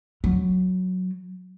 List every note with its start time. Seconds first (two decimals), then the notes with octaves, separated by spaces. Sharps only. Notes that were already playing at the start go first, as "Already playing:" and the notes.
0.24 F#3